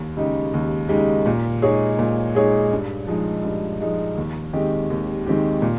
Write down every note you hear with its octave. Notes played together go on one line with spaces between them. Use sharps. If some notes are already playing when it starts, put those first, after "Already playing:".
Already playing: D#2
C#3 G#3 D#4 G4
D#2
C#3 G#3 D#4 G4
A#2
G#3 D#4 G#4 C#5
A#2
G#3 D#4 G#4 C#5
G2
F3 G#3 D#4
G2
F3 G#3 D#4
D#2
D#3 G#3 C4 G4
D#2
D#3 G#3 C4 G4
A#2